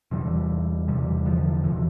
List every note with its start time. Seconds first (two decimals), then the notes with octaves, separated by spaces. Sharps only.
0.11 E2 C3 E3 G3
0.88 E2 C3 E3 G3
1.26 D3 F3
1.64 E2 C3 E3